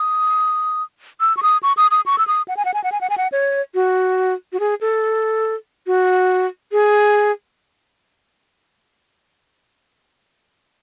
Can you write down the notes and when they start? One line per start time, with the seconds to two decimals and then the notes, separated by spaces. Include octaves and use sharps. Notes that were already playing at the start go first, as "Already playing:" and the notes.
Already playing: D#6
1.20 E6
1.37 C#6
1.43 D#6
1.63 C#6
1.77 D#6
1.91 D#6
2.06 C#6
2.18 E6
2.27 D#6
2.48 F#5
2.57 G#5
2.65 F#5
2.74 G#5
2.84 F#5
2.92 G#5
3.01 F#5
3.10 G#5
3.18 F#5
3.32 C#5
3.74 F#4
4.52 F#4
4.60 G#4
4.81 A4
5.87 F#4
6.72 G#4